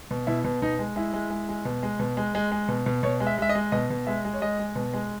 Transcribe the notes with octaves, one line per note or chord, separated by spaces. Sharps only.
B2
B2 E4
B2
B2 D#4
G#3
G#3 E4
G#3
G#3
G#3
B2
G#3
B2
G#3
G#3
G#3
B2
B2
B2 C#5
G#3
E5
G#3 E5
D#5
G#3
B2 D#5
B2
G#3 E5
G#3
C#5
G#3 D#5
G#3
B2
G#3